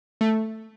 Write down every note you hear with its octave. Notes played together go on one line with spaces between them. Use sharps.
A3